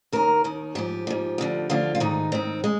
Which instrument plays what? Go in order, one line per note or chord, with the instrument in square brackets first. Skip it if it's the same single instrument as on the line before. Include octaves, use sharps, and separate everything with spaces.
[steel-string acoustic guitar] D#2 D#3 A#4
D#2 D#3
G#2 F3 G4
G#2 F3
D2 D3 F3
D2 D3 F3 F4
F4
G#2 D#3 D#4
G#2 D#3 C4
G#3